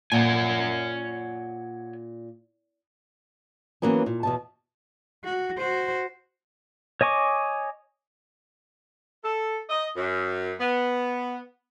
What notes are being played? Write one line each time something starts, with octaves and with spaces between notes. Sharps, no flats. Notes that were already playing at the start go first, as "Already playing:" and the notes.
A#2 C#5 F#5 G#5
E3 F#3 A#3 B3 C#4
A#2
E2 B2 A5
F#4
F#4 C5
C#5 D#5 G#5 C#6 D6
A4
D#5
F#2
B3